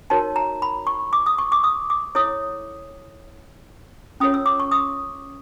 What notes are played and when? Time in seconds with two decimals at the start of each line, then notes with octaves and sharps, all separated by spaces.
0.10 D#4 F#4 A#4 C#5 A5
0.36 A#5
0.62 B5
0.87 C#6
1.13 D6
1.26 D#6
1.38 C#6
1.52 D6
1.64 D#6
1.90 D6
2.15 E4 A4 C#5 D#6
4.20 C#4 F4 A4 C#5 D#6
4.34 E6
4.46 D6
4.60 C#6
4.71 D#6